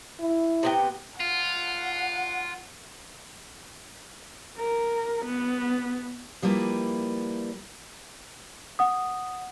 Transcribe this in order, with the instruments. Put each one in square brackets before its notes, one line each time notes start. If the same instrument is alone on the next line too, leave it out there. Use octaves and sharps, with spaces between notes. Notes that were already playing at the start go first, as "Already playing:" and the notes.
[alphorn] E4
[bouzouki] C3 B3 G5
[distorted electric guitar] F4 [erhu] F#5
[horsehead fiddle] A#4
B3
[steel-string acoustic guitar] F3 G3 A#3 E4 B4
[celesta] F#5 D#6